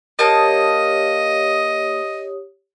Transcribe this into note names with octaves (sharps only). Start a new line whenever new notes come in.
A#3 G4 C#5 D#5 A5 D#6